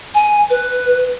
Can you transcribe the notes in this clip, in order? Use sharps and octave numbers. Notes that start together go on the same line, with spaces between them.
G#5
B4